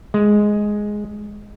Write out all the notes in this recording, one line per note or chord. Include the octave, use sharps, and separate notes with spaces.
G#3